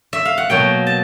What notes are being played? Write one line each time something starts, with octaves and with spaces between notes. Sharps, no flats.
E5
F5
F#5
B2 F#3 A#3 G5
A5